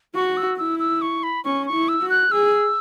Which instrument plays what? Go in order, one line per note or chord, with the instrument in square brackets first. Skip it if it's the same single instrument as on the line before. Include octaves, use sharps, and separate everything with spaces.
[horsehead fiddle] F#4 [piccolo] C#6
[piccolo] E6
[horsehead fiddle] E4 [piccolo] E6
[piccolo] E6
C#6
B5
[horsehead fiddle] C#4 [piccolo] C#6
[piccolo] C#6
[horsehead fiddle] E4
[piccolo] E6
[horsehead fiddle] F#4
[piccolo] F#6
[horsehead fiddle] G#4 [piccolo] E6